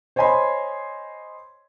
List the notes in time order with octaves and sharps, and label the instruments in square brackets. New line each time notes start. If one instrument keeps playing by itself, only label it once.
[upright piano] C5 C#5 D#5 G#5 B5 C6